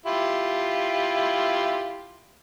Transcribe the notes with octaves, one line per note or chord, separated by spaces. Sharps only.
E4 F4 G4